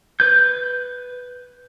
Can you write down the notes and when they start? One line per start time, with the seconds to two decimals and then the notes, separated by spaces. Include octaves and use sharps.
0.20 B4 G6